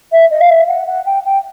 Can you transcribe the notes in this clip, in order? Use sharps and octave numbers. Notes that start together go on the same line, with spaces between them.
E5
D#5
F5
E5
F#5
F#5
G5
G5